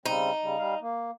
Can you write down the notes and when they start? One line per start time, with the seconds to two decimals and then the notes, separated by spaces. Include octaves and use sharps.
0.06 C#3 G3 C4 D#4
0.42 C#3 G3
0.58 G3 F5
0.81 A#3